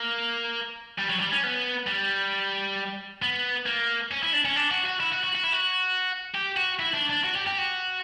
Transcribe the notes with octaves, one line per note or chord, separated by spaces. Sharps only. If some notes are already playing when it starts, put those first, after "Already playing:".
Already playing: A#3
G3
F#3
G3
C#4
B3
G3
B3
A#3
C#4
E4
D4
C#4
D4
F#4
F#4
E4
F#4
F#4
F#4
E4
F#4
G4
F#4
E4
D4
D4
F#4
G4
G4
F#4